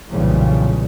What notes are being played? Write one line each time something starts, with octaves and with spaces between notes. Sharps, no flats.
B1 F2 A#2 C#3 E3 G3